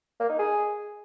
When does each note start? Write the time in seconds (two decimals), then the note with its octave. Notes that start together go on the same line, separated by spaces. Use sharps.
0.20 A#3
0.29 D#4
0.39 G#4